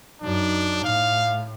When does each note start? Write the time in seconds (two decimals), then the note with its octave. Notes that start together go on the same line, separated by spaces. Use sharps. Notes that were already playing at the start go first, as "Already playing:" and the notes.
0.22 F#2 D4 D#4
0.84 A2 F5